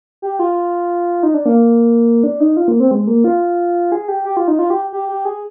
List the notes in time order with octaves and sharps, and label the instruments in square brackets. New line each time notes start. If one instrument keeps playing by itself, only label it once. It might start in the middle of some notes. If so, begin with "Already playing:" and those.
[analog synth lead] G4
F4
D#4
D4
A#3
D4
D#4
F4
A#3
C4
G#3
A#3
F4
G#4
G4
G4
F4
D#4
F4
G4
G4
G4
G#4